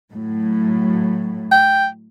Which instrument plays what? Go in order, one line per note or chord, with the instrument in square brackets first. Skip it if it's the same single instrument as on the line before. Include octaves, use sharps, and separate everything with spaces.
[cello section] A2 F#3
[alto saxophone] G5